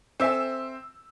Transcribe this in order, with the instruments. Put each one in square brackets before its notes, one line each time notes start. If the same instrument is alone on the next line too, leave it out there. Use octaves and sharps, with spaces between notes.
[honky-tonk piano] C4 E6 [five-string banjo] A4 E5 G#5